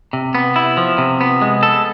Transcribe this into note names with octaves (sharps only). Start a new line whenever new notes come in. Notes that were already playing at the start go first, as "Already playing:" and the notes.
C3
B3
E4
F3
C3
B3
G#3
A4